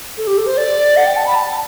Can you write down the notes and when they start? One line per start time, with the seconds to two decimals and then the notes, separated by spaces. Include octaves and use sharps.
0.18 A4
0.27 G4
0.37 A4
0.47 C5
0.57 D5
0.97 F#5
1.07 G5
1.16 A5
1.27 B5
1.36 A5